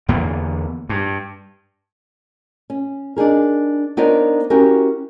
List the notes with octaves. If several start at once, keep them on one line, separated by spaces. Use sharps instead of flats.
E2 D3 A#3 B3
G2
C#4
D4 D#4 G#4 A#4
B3 D4 D#4 A#4 C5 C#5
C#4 E4 F#4 G4 A#4